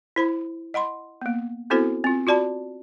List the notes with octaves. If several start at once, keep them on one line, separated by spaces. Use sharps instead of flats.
E4 C5 B5
D#5 F#5 B5 C6
A#3 B3
B3 C4 E4 F#4 A4 C5
C4 F4
F4 F#4 D5 A5 B5